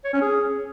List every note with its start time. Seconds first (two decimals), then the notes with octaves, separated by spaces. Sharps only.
0.05 C#5
0.13 C#4
0.21 G#4